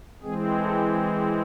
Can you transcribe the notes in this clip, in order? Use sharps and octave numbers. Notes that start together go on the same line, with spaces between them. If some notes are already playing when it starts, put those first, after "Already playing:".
E3 G#3 C4 G#4
A4
G#4